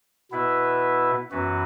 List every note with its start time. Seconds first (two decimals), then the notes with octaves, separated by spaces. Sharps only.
0.31 B2 B3 E4 B4 E5
1.31 F#2 E3 B3 F#4 B4